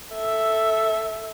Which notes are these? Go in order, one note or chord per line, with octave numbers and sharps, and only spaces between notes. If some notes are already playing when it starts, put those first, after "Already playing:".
A4 E5